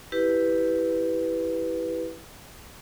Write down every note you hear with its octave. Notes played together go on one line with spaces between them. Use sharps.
E4 G4 B4